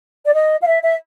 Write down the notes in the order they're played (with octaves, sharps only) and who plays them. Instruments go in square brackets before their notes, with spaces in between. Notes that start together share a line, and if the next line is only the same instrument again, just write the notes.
[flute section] D5
D#5
F5
E5
E5